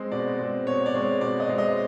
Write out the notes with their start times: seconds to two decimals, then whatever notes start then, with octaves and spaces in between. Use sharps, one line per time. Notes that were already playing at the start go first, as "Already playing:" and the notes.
Already playing: G#3 C4 D#5
0.12 B2 D5
0.39 G#3 C4
0.67 B2 C#5
0.86 D5
0.95 G#3 C4 C#5
1.21 B2 D5
1.40 D#5
1.49 G#3 C4
1.58 D#5